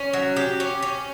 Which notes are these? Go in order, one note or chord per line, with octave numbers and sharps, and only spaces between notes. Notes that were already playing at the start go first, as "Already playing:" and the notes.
Already playing: C#4
F#3
G4
C#4
C#4